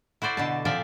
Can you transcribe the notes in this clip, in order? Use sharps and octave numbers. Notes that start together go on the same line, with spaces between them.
E4 F#4 C5 D5
B2 D3 A5
A#2 F3 C4 D5 E5